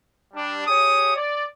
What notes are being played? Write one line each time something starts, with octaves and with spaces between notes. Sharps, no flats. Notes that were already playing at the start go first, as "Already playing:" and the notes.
G3 D4
G4 G#4 C#5 D#6
D5